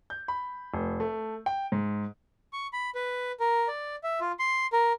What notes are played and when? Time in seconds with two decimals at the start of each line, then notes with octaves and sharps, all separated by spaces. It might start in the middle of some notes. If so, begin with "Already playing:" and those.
0.10 G6
0.28 B5
0.74 F1
1.00 A3
1.46 G5
1.72 G#2
2.53 C#6
2.73 B5
2.95 B4
3.40 A#4
3.68 D5
4.03 E5
4.21 F4
4.39 C6
4.73 A#4